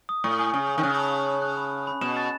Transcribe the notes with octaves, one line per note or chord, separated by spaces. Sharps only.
D#6
A2 C#6
G#5
C#3 G#5
G#5
D#3
C#3 F#6
A5
C#6
C#6
F#6
B5
B5
B5
B2 E7
A6